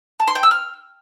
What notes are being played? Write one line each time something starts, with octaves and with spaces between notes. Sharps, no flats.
A5
C6
G5
E6
F6